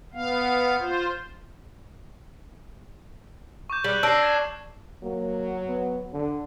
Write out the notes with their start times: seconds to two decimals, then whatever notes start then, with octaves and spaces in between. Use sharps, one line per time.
0.14 B3 F5
0.80 F4 C5
3.70 C#6 D6 G6
3.84 G3 F#6 F#7
4.03 D4 E6 A#6 C7
4.23 G#6 E7
5.03 F#3 A#3
5.68 B3
6.13 D3